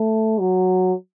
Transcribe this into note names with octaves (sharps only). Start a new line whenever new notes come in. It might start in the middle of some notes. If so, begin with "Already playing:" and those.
Already playing: A3
F#3